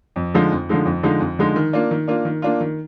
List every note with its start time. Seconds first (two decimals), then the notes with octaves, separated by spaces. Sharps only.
0.16 F2
0.34 D3 F3 G#3 D#4
0.52 F2
0.69 D3 F3 G#3 D#4
0.86 F2
1.03 D3 F3 G#3 D#4
1.20 F2
1.39 D3 F3 G#3 D#4
1.56 D#3
1.73 A#3 D4 F4
1.91 D#3
2.08 A#3 D4 F4
2.25 D#3
2.42 A#3 D4 F4
2.60 D#3